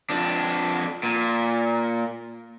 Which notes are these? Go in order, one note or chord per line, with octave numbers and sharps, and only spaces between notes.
F2 D4
A#2